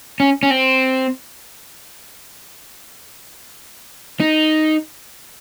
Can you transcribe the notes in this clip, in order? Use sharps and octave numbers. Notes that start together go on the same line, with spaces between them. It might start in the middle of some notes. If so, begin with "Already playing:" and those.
C#4
C#4
C4
D#4